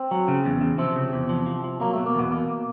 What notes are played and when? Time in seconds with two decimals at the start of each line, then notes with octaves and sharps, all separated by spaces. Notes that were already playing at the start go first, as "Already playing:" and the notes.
Already playing: C4
0.11 F#3
0.28 C#3
0.45 E2
0.61 C#3
0.78 C3 F3 C4
0.96 C#3
1.13 E2
1.29 F3
1.46 F3
1.64 F3
1.80 F#3 A#3
1.94 B2 A3
2.06 A#3
2.15 E2 B2 B3
2.31 B2 A#3
2.49 B2